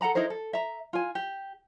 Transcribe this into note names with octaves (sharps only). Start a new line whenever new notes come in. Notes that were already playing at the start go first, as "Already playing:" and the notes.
A4 F#5 A#5 B5
D#4 E4 A#4 C5
A4
E5 A#5
F4 G#5
G4